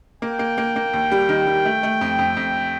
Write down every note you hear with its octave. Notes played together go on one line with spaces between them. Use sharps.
A#3 G5
A#3
A#3
A#3
D#2
G3
D#3
G3
A3
A3
F2
F2
F2